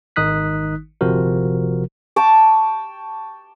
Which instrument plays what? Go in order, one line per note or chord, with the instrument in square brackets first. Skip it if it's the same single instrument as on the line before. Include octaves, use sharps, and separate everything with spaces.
[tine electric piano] G#1 D#3 D#4 D#6 F#6 B6
G1 C3 F3 F#4 A#4
[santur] G5 A5 C#6 D6